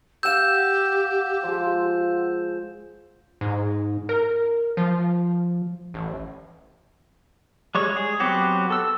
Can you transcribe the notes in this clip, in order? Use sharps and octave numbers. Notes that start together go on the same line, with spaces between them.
G4 F5 F#5 E6 G6 E7
F3 G#3
G#2
A#4
F3
A1
G3 G#3 C#5
G#4
F#3 B3 C4 F#4 G4
A4 E6